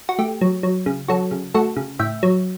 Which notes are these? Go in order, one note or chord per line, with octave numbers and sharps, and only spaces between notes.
F#4
A3 G4
F#3
F#3
C#3
F#3 F#4 A4
C#3
A3 F#4 A4
C#3
A2 E5 G5
F#3